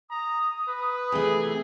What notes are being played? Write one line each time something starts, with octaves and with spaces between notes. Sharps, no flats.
A#5 D#6
B4
C3 E3 A3 G#4